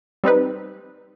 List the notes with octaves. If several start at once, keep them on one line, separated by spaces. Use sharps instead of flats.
G3 C4 D#4 B4